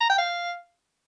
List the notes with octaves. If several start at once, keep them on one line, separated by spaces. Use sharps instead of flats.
A#5
G5
F5